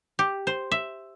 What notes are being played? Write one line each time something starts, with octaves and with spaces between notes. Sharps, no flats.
G4
C5
E5